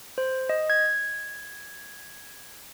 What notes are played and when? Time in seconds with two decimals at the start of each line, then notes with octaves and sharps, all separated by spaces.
0.18 C5
0.49 D#5
0.70 G#6